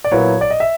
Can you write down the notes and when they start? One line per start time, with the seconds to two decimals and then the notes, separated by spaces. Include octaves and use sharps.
0.04 D5
0.11 A#2 F#3 B3 E4 C#5
0.41 D5
0.51 D#5
0.60 E5